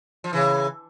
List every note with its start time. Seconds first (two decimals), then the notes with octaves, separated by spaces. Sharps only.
0.24 F3
0.33 C#3 E3